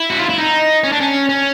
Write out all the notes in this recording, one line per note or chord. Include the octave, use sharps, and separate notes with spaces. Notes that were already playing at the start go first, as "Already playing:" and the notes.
Already playing: E4
F#4
F4
E4
D#4
C#4
D4
C#4
C#4